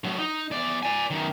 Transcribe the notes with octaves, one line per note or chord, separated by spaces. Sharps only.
A2 F#3
D#4
E2 D5
D5 G#5
F#2 D#3